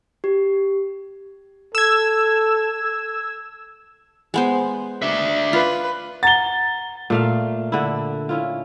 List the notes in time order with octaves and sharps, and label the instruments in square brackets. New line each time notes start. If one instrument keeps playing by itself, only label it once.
[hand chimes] G4
[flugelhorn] A4 [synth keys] E6 G#6
[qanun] G#3 B3 C5
[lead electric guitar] D4 E5
[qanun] F4 [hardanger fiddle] B4
[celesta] F#5 A#5 [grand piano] A6 G7
[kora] A#2 A3 F5
D3 E4
C#4 E4 F4